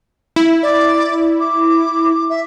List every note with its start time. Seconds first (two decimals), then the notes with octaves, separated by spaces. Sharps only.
0.36 E4
0.63 D5
1.40 D6
2.30 E5